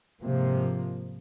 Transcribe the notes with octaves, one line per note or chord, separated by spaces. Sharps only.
G#2 C3 F3 A#3